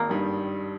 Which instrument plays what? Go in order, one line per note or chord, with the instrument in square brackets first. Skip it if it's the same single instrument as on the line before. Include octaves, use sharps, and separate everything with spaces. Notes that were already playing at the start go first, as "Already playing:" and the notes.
Already playing: [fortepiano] G#1 [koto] A#3
[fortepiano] G2 D#3 G3